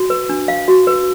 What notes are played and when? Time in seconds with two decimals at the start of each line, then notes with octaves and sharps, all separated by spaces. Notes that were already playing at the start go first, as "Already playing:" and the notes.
Already playing: F#4
0.10 B4
0.29 D4
0.48 F5
0.68 F#4
0.87 B4